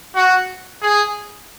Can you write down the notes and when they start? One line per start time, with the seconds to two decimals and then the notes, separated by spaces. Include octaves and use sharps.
0.16 F#4
0.82 G#4